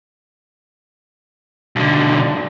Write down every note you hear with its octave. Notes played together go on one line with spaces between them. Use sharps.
B1 D3